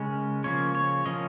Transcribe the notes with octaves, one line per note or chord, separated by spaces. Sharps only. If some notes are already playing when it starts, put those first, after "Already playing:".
Already playing: C#3 G#3 C#4 A#4
C#3 F3 A#3 C#4 C#5
C#5
C#3 F3 A#3 C#4 D#5